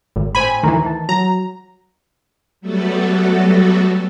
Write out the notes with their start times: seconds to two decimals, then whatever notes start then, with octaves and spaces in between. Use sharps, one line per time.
0.16 G#1
0.35 A2 C5 G5 G#5 B5
0.63 D2 D#3 E3 A3 A#5
0.86 A5
1.09 F#3 A#5
2.61 F#3 G3 A3 B3 F#4 A4